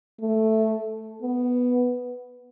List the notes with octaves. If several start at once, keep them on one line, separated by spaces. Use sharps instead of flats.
A3
B3